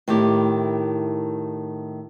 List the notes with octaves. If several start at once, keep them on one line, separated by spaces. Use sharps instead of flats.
A2 D#3 E4 G4